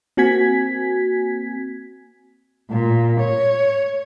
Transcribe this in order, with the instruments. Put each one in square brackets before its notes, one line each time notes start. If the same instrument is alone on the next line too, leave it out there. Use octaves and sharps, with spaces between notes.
[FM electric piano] A#3 C4 F#4 G#5 G#6 B6
[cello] A#2
C#5